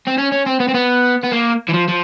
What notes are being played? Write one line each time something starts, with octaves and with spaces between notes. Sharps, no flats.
C4
C#4
C#4
C4
B3
C4
B3
B3
A#3
E3
F3
F3